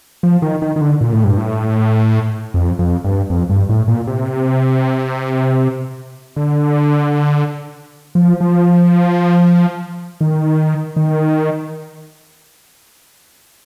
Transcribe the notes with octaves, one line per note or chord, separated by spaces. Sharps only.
F3
D#3
D#3
D#3
D3
A#2
A2
G2
A2
F2
F2
G2
F2
G2
A2
A#2
C3
D3
F3
F3
D#3
D#3